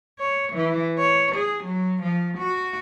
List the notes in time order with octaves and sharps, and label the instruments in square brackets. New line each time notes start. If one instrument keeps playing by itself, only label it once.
[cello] C#5
E3
C#5
G#4
F#3
F3
F#4